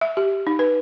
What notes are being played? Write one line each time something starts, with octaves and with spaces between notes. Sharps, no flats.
E5
G4
D#4
B4